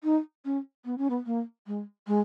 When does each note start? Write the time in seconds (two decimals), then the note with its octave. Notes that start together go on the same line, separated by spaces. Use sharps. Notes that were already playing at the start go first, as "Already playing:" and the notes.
0.04 D#4
0.45 C#4
0.85 B3
0.98 C#4
1.10 B3
1.26 A#3
1.67 G#3
2.07 G#3